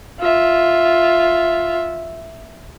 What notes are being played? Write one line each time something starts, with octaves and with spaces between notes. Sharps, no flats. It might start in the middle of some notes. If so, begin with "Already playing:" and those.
F4 E5